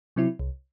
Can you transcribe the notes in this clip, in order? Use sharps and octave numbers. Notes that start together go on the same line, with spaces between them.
C3 F#3 C4 E4
C2